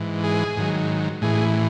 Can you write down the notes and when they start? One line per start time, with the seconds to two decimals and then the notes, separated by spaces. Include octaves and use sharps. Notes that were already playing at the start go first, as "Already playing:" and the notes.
Already playing: G#2 E3
0.24 G#4
0.57 G#2 D#3 F#3
1.22 A2 E3 G#4